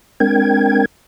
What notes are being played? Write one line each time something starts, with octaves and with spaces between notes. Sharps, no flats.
G#3 C4 D4 A#4 G5 G#6